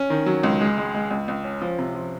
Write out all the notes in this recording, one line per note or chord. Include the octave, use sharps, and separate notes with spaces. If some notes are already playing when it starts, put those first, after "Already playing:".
Already playing: C#4
D#3
F#3
C#2
G#3
G#3
G#3
C#2
C#2
C#4
F3
C3
F3